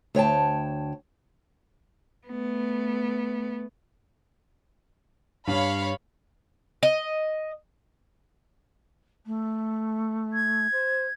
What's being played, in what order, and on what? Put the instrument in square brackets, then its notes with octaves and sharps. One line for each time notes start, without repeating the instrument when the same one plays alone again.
[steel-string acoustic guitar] D2 C#5 G5 A5
[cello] A3 B3
[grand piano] G2 [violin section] C#5 F5 B5
[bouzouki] D#5
[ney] A3
[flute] G#6
[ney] C5